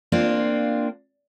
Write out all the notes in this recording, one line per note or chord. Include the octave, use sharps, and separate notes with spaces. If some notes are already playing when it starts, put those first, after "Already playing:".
A#3 C4 D4 F4